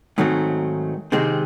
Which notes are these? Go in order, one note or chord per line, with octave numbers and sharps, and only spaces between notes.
G#2 D#3 F#3 A3 C4
C3 D#3 G#3 C4